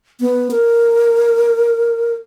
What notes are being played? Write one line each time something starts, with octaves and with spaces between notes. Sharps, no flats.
B3
A#4